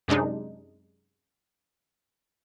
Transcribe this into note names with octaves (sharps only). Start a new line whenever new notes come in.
F#2 C3 G#3 D4 D#4